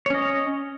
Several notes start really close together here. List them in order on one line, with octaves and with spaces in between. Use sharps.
C#5 C#4 D#5